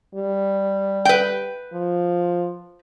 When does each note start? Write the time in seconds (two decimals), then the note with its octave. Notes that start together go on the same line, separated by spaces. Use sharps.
0.15 G3
1.05 B4 G5
1.73 F3